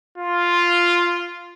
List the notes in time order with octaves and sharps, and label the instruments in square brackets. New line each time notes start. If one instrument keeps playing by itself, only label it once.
[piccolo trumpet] F4